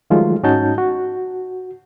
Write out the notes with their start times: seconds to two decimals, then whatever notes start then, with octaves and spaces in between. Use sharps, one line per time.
0.10 D#3 F3 F#3 G#3 A3 F4
0.43 G#2 C#4 D#4 F#4 A5 G6
0.78 F#4